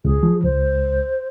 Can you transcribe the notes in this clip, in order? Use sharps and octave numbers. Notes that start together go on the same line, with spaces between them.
C#2 G#4
F3
C#2 C5